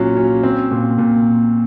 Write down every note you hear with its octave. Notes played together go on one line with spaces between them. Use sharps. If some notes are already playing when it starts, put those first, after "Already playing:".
Already playing: A#2 F#3 C#4 F4
C#4
C4
A#2
A#2